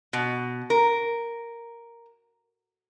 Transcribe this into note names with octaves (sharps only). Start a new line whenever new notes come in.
B2
A#4